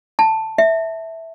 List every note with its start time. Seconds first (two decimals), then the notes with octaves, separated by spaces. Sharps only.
0.19 A5
0.58 E5